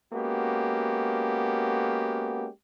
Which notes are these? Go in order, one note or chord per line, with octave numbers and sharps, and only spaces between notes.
G#3 A#3 B3 C#4 F#4 G4